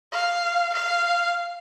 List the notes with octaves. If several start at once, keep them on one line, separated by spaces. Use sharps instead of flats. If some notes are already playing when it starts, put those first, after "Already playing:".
F5
F5